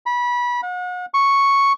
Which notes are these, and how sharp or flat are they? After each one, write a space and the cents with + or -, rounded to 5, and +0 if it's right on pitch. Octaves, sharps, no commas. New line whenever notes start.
B5 -25
F#5 -40
C#6 +0